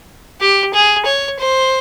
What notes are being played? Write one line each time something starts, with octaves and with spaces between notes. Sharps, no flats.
G4
G#4
C#5
C5